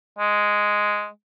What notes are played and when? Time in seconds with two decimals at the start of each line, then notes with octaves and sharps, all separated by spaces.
0.19 G#3